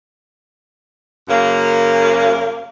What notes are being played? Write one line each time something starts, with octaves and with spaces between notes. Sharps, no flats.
F#2 C#3 A#3